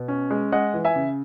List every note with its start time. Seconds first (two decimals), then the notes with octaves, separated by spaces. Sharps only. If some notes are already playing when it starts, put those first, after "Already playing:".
Already playing: B2
0.08 C#4
0.31 G#3
0.52 G#3 D#5 F#5
0.74 E3
0.85 E5 G#5
0.96 C#3